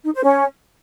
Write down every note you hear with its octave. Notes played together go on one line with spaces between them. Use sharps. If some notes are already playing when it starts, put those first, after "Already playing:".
D#4
C5
C#4